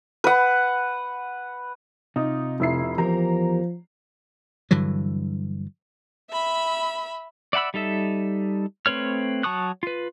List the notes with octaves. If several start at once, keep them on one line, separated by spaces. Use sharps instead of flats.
B4 F#5
C3 D#4 F4
F1 E4 C7
E2 F3 G4 A#4 A#5
G2 D3 E3 F#3
E5 B5
D5 E5 F#5 B5 E6
G3 D#4 A4 E5
A3 C4 B4 C#5 F6
F#3 A5 C#6 D#6 F#6
F4 B4